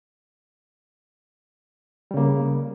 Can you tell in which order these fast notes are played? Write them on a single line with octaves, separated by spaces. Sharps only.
G3 C#3 A#3